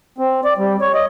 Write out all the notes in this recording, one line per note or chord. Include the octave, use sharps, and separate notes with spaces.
C4
D5
G3
C#5
D#5